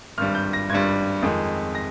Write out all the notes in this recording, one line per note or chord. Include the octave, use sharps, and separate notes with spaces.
G#1 G2 G3 F6
G6
A#6
G#1 G2 G3 G#6
F2 D#3 G#3
A#6